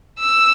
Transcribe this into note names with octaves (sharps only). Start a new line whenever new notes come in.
E6